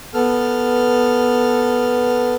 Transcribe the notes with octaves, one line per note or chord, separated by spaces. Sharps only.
B3 A4 F6